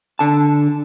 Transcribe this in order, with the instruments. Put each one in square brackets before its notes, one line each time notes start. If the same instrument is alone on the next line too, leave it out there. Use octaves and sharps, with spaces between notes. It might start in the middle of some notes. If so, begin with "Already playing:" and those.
[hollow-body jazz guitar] D3 A5